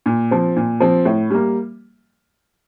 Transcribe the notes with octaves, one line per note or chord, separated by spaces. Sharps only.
A#2
F3 C4
A#2
F3 C4
A2
G3 A#3